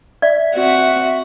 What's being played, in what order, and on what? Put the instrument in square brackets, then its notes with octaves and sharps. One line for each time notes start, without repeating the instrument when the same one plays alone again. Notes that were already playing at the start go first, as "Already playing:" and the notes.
[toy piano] D5 [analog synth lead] E5
[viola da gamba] C4 F#4